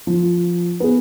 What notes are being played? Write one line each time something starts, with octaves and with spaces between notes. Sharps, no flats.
F3
B3 G#4